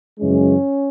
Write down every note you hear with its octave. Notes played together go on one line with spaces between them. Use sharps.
F#2 C#3 E3 G#3 C#4